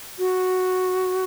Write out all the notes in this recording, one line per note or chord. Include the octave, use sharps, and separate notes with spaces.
F#4